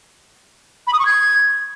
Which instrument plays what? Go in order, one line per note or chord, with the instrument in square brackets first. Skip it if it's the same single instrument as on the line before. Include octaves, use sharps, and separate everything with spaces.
[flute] B5
D#6
C#6
G#6